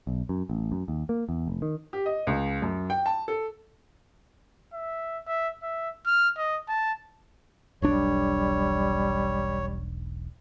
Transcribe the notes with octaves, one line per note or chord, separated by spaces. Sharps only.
B1
F#2
A1
F#2
D#2
A#3
E2
F1
D#3
G4
D#5
C#2
F#2
G5
A5
A4
E5
E5
E5
F6
D#5
A5
E1 B1 G3 D4 C#5